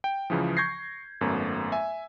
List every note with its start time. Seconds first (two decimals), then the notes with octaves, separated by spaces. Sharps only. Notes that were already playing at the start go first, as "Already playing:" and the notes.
0.04 G5
0.30 C#2 C#3 E3 F3
0.57 C#6 G6 G#6 A#6 C7
1.21 G#1 F#2 A3 B3
1.72 E5 G#5